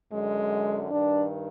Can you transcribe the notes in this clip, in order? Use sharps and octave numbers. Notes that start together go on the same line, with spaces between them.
F#2 D3 G#3
G2 D#3 D4